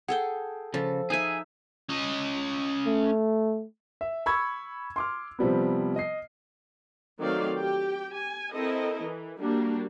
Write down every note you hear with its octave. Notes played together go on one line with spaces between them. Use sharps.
G#4 A4 F#5 G5
C#3 F3 A4
D#4 G#4 E5 G#5
C#4 D#5
A3
E5
B5 C#6 E6 G#6
C6 D6 F6
C3 F3 G3 B3
D#5 C7
D#3 F#3 A3 C4 D5 F5
G4 G5
G#5
C4 E4 A4 A#4 D#5
E3
G3 A#3 D4 F#4